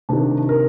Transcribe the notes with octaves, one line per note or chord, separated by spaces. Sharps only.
C3 D#3 D4
A#4